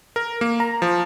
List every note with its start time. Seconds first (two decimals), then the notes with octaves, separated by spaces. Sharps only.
0.16 A#4
0.41 A#3
0.60 A#5
0.82 F3